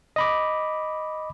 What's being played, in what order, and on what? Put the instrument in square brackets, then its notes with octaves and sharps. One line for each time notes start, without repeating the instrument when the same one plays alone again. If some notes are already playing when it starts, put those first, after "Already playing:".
[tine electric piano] D#5 B5 D6